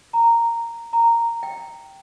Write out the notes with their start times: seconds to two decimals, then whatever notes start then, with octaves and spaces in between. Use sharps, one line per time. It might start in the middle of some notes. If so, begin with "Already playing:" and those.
0.13 A#5
0.93 A#5
1.43 G5